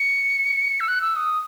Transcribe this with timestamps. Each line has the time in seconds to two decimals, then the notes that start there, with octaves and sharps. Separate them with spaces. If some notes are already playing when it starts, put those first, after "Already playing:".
Already playing: C#7
0.80 E6
0.88 F#6
1.02 E6
1.16 D#6